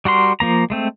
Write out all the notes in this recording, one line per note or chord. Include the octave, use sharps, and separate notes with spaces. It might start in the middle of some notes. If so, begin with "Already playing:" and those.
G3 F#4 A#4 C6
F3 A#3 A#5
G#3 A3 C4